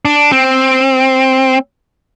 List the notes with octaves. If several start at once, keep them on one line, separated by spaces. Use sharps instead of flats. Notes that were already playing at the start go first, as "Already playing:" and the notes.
D4
C4